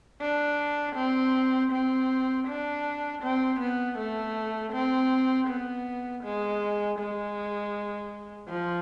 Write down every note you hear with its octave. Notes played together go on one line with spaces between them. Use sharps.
D4
C4
C4
D4
C4
B3
A3
C4
B3
G#3
G#3
F3